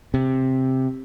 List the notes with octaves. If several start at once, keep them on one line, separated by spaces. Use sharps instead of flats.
C3